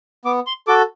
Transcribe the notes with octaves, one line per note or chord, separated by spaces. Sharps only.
B3 D6
C6
F#4 A4 D6